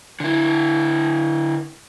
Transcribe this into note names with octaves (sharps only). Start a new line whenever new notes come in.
D3 E4